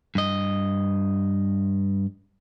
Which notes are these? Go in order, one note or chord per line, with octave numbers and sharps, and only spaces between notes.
G2 D#5